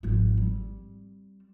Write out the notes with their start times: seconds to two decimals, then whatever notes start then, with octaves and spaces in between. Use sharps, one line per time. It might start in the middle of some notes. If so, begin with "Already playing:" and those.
0.03 G#1 F3
0.37 G3 C4